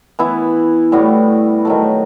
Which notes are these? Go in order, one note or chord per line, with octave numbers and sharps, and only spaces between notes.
E3 B3 E4
A2 G3 B3 F#4
D#3 F#3 A3